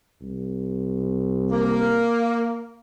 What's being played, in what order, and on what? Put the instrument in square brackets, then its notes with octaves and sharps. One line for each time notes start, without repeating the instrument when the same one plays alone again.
[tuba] C2
[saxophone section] A#3